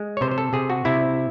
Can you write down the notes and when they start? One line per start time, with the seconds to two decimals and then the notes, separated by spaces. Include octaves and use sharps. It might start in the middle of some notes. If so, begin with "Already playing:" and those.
Already playing: G#3
0.17 C#5
0.21 C3 C5
0.31 C5
0.38 A4
0.53 C3 G#4
0.70 F#4
0.85 C3 E4